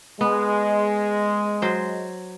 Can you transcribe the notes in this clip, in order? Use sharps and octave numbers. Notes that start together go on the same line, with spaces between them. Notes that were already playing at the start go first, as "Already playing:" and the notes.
G#3 B3
F#3 C5